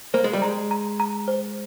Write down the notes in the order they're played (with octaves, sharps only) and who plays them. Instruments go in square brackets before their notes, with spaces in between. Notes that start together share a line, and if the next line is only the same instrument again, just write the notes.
[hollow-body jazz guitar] A#3 [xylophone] C5
[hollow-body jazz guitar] G#3
G3
[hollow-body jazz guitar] G#3 [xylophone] A#5
[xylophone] A#5
A#5
C5